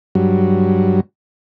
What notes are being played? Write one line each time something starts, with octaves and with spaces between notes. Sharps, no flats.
G2 F#3